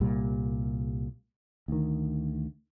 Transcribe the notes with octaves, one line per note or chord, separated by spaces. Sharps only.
C2 A#2 G3
D2 D#3